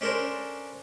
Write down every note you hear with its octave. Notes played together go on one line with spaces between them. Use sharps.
C#4 D4 A4 A#4 C5